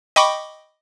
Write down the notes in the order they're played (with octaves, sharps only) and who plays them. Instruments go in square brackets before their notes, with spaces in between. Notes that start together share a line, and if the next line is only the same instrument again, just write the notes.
[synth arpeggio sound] D#5 G5 B5 C#6 D6